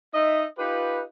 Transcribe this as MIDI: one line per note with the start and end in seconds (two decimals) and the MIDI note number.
0.15 0.45 63
0.15 0.45 75
0.15 0.45 76
0.59 1.03 63
0.59 1.03 65
0.59 1.03 67
0.59 1.03 71